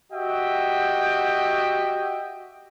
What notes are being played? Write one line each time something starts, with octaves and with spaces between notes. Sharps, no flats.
F#4 G4 D#5 E5 G5